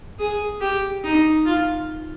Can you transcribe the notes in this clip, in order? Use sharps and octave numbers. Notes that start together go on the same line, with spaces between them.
G#4
G4
D#4
F4